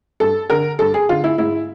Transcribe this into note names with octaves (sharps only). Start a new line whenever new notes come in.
G2 A4
D3 A#4
G2 A4
G#4
D3 F4
E4
G#2 E4